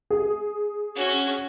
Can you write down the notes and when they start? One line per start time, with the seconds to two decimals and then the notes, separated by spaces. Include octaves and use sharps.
0.10 G#4
0.96 C#4 F#4